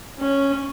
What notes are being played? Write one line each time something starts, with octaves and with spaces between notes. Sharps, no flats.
C#4